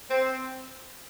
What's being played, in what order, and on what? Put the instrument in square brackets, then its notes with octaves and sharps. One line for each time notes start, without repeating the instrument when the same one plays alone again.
[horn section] C4